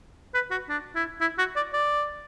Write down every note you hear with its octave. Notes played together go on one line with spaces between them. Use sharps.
B4
F#4
D4
E4
E4
F#4
D5
D5